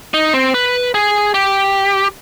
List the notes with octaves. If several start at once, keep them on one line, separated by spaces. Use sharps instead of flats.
D#4
C4
B4
G#4
G4